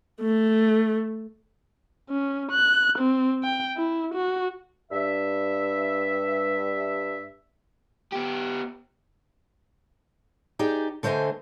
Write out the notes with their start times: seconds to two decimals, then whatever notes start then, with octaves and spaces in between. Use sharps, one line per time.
0.21 A3
2.10 C#4
2.52 F#6
2.99 C4
3.44 G5
3.77 E4
4.14 F#4
4.92 G2 E5
8.12 B3 G4
10.59 D#4 G4 G#4 D5
11.03 D3 A3 C5 D#5 G#5